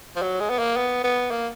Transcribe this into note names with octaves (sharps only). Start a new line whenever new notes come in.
F3
F#3
G#3
B3
A#3
B3
B3
A#3